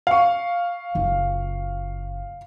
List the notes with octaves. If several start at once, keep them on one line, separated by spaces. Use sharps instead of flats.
F5 C#6
F#1 F4